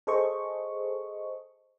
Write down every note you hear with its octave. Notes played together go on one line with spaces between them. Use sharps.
G#4 A4 C5 D#5 C#6